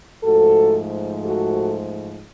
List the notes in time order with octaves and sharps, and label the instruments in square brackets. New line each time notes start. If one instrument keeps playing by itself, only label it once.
[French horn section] G#2 F3 A3 F#4 A4
F#4 A4